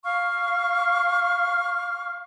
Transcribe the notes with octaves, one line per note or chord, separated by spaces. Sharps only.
F5 C#6 F6